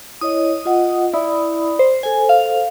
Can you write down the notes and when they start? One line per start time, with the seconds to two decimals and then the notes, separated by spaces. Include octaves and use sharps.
0.21 E4 C#5 D#5 D#6
0.65 F4 D#5 F#5
1.13 E4 D5 B5 D#6
1.79 C5
2.03 A4 C5 G#5
2.29 F5